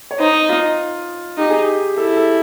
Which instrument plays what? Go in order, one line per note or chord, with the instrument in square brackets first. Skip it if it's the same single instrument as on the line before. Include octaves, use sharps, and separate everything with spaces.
[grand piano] C#5
[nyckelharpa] D#4 [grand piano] C5
[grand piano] F4
[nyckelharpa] D#4 [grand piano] G4
[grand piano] G#4
G4
[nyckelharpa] E4 [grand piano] A4
[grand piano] A4